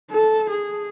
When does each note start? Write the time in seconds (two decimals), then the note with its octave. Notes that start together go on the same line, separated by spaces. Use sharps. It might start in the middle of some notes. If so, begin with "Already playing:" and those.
0.11 A4
0.50 G#4